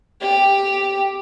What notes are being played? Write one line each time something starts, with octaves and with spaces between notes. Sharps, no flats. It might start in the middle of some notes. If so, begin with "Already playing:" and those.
G4